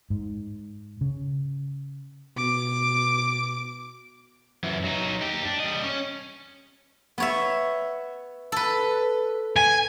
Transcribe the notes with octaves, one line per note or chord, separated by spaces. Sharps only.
G#2
C#3
B2 D6
F#2 E3
F#3 D#4
D#4 G4
D4
G3 D#5
C#4
B3 C#5 E5
A4 B4
G#5